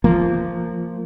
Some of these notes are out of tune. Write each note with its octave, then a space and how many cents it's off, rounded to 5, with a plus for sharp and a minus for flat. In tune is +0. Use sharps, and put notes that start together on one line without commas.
F3 -15 A#3 -20